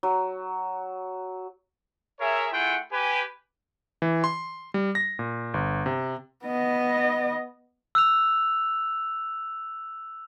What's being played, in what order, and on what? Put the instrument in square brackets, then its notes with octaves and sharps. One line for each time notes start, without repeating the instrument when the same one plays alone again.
[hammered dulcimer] F#3
[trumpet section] G#4 A#4 C#5 E5
A3 E4 F4 G#4 F#5 G5
G4 B4 G#5
[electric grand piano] E3
C6
G3
A#6
A#2
G1
C3
[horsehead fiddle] B3 D#5
[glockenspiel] E6 F#6 F7